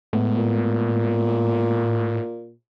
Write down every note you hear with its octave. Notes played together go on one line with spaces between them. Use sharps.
A2 G#3 A3 B3
A#2